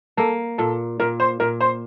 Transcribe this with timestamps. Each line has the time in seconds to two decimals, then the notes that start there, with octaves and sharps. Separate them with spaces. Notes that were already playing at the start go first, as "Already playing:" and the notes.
0.17 A#3 A4
0.58 A#2 A4
1.00 A#2 A#4
1.20 C5
1.40 A#2 A#4
1.61 C5